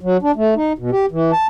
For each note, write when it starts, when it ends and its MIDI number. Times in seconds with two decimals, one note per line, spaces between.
0.01 0.17 54
0.22 0.31 62
0.36 0.54 57
0.56 0.73 63
0.78 0.91 47
0.92 1.06 67
1.11 1.32 52
1.32 1.47 81